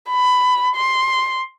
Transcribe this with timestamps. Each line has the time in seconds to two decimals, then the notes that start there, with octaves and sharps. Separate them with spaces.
0.10 B5
0.75 C6